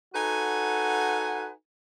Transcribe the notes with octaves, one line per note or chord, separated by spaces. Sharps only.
D#4 F#4 A4 B4 F#5 G#5